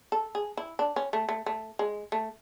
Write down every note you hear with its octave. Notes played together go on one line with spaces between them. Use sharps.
A4
G#4
E4
D4
C#4
A3
A3
A3
G#3
A3